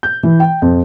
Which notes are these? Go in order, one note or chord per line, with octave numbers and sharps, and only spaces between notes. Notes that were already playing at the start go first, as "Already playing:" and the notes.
G6
E3
G5
F2